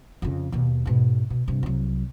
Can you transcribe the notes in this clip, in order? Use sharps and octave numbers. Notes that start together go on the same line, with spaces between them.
F2 C#3
D#2 B2
G#2 B2
B2
G2 C3
C2 F#3